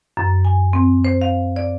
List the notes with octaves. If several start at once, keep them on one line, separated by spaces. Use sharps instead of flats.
F#2
G#5
C4
C5
F5
D5